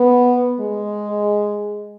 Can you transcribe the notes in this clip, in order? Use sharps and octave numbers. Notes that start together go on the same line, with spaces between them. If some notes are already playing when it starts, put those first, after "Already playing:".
Already playing: B3
G#3